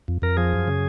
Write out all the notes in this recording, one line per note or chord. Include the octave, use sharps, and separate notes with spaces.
F2
F2 A#4
F3 G#4
F#2
C#3